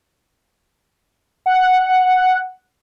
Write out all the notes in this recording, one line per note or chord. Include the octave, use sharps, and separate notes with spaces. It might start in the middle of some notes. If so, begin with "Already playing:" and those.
F#5